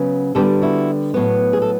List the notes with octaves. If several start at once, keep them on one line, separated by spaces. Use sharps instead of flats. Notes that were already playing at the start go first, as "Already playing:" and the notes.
Already playing: C#3 F#3 B3
D3 G3 B3 G4 A4
E4 F#4
A2 F#3 B3
G#4
A4